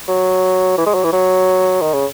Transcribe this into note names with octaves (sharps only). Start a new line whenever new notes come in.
F#3
E3
G#3
F#3
E3
F#3
D#3
C#3